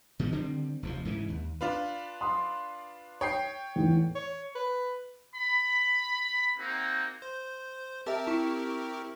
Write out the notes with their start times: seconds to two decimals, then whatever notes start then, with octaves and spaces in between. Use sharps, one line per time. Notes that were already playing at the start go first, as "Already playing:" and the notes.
0.19 B2 D#3 G#3
0.32 D3 D#3 G3 C4
0.83 F1 D#2 A#2 F3
1.05 G#2 C#3 E3
1.28 D#2
1.61 D4 F4 B4
2.21 C6 D#6
3.21 C#5 G5 D#6 C7
3.76 E2 A2
4.15 C#5
4.55 B4
5.35 B5
6.58 A#3 C4 D#4 F#4
7.22 C5
8.06 C4 G4 A#4 E5 A5
8.27 E4 C#6